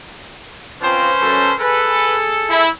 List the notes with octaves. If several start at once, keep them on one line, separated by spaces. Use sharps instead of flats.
F3 C4 C#4 B4 C5
F#2 A4 A5
G#4 A4 B4
E4